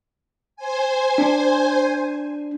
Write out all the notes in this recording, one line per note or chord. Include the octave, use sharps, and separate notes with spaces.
C5 G#5
D4